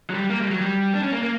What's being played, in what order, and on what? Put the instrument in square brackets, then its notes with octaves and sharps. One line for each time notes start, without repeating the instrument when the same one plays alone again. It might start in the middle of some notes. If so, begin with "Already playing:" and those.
[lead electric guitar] F#3
G3
A#3
G3
F#3
G3
D4
C#4
A#3
A#3